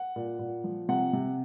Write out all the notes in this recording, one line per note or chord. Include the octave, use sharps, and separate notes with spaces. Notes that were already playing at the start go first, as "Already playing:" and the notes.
Already playing: F#5
A#2
A#2
F3
C3 F#5
C3